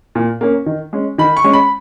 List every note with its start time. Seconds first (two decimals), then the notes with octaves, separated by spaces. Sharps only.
0.15 A#2
0.41 A#3 C#4
0.66 D#3
0.93 G#3 C#4
1.18 D#3 B5
1.37 C#6
1.44 G#3 C#4
1.53 B5